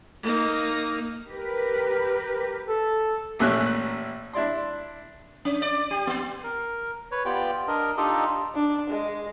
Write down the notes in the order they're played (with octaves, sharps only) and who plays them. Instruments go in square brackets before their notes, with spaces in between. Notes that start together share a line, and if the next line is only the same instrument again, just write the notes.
[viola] A#3 D#4
[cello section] G4 A#4 B4
[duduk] A4
[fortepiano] A1 A#2 A3 A#3 C#4 F#6
D4 E4 D5 C6
[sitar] C#4
D5
G4
B3
[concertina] A#4
B4 C#5
B3 F4 G4 D5 G5
D4 A#4 D#5
D4 D#4 F4 G4 A4 D#5
[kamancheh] D4
G#3